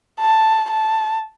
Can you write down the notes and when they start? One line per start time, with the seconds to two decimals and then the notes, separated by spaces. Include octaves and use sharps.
0.20 A5
0.71 A5